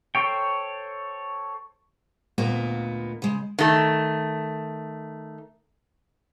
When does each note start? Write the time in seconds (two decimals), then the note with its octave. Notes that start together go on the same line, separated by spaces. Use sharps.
0.15 A4 C5 C#5 G5
2.38 D2 A#2 A#3 B3 D#5
3.22 C#3 G#3
3.59 D#3 A3